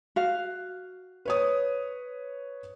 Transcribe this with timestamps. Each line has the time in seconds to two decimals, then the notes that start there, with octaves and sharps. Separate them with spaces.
0.16 F#4 F5
1.25 B4 C#5 D#6